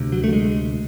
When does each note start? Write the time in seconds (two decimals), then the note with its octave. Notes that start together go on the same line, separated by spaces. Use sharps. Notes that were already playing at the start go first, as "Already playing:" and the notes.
Already playing: D2 C3
0.12 F#3
0.24 A3
0.33 G#3